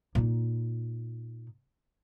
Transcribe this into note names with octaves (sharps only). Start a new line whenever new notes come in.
A#2 D#4